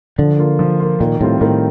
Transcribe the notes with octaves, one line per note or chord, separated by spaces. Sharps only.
D3 F3
A#3 F4
F3
A#3 F4
A#2 D#3
A2 G3 C4 F4
A2 D#3